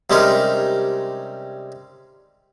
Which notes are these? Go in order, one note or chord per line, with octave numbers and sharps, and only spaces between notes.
C3 G3 G#3 C#4 D#4 A#4